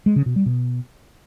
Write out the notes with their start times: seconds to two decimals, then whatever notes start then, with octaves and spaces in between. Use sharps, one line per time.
0.06 G#3
0.16 C#3
0.26 B2
0.36 G3
0.46 B2